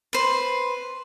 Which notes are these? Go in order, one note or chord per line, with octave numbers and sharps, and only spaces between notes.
B4 C5